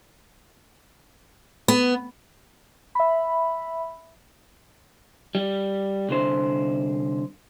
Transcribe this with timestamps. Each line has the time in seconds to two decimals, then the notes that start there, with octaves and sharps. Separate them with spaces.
1.68 B3
2.95 E5 B5
5.35 G3
6.09 C2 D3 C5